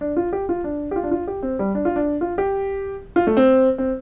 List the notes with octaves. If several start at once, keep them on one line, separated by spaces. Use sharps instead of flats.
D4
F4
G4
F4
D4
G4
F4
D4
F4
G4
C4
G3
D4
F4
D4
F4
G4
F4
A3
C4
C4